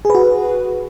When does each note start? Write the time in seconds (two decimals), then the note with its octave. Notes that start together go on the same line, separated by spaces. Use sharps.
0.05 G#4
0.10 B4
0.15 F#4